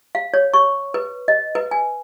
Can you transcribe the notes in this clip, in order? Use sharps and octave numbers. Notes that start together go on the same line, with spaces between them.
F5
C#5
C#6
B4
D#5
B4
G#5